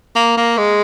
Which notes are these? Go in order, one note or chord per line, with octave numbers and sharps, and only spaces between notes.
A#3
A#3
G#3